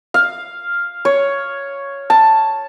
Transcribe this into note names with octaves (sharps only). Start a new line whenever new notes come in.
F5
C#5
A5